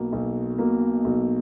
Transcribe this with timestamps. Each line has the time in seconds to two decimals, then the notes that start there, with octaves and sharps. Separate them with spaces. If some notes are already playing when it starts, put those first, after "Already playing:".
Already playing: B1 B2 A#3
0.12 B1
0.59 B2 A#3
1.04 B1